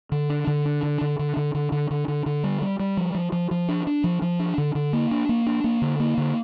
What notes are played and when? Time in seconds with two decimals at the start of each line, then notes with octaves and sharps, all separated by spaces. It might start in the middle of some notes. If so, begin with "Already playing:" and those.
0.12 D3
0.30 D4
0.47 D3
0.66 D4
0.83 D3
1.01 D3
1.19 D3
1.37 D3
1.55 D3
1.72 D3
1.91 D3
2.08 D3
2.26 D3
2.44 G3
2.62 G3
2.79 G3
2.97 F3
3.15 F3
3.32 F3
3.51 F3
3.69 D4
3.87 D4
4.04 F3
4.22 F3
4.39 D4
4.58 D3
4.75 D3
4.93 A#3
5.11 D4
5.29 A#3
5.47 D4
5.64 A#3
5.82 D3
6.00 A#3
6.18 D3